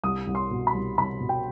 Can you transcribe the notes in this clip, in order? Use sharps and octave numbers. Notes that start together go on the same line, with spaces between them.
C2 D#6
C2
C6
B2
B5
C2
C2 B5
B2
G5